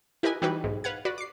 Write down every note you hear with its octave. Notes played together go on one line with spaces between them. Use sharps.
E4 G4 A#4 B4 D#5 G#5
E3 G3 D#4 E4 F#4 B4
B1 G#2
B4 F5 F#5 G#6
F#4 B4 D5
D6 C7